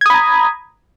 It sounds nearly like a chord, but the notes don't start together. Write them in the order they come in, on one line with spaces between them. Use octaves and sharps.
G#6 D#6 B5 A#5